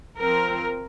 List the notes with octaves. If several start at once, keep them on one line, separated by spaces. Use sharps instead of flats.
F3 C4 A#4